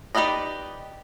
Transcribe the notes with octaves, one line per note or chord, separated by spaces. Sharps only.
D#4 G4 B4 D5 D#5